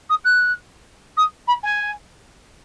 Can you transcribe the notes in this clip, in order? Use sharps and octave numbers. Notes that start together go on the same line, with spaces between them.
D#6
F#6
D#6
B5
G#5